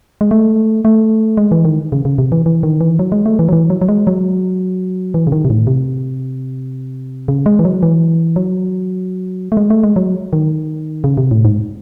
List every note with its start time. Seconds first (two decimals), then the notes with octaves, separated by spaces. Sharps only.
0.21 G#3
0.31 A3
0.85 A3
1.37 G#3
1.51 E3
1.65 D#3
1.92 C#3
2.05 C#3
2.18 C3
2.32 E3
2.46 E3
2.63 D#3
2.81 E3
2.99 F#3
3.12 G#3
3.26 A3
3.39 E3
3.49 F#3
3.53 E3
3.70 F#3
3.81 F#3
3.89 G#3
4.07 F#3
5.14 E3
5.27 C#3
5.32 D#3
5.45 C3
5.50 A2
5.67 C3
7.28 C#3
7.46 G#3
7.59 E3
7.65 F#3
7.83 E3
8.36 F#3
9.52 A3
9.57 G#3
9.70 A3
9.84 G#3
9.96 F#3
10.33 D#3
11.04 C#3
11.17 C3
11.31 A2
11.45 G#2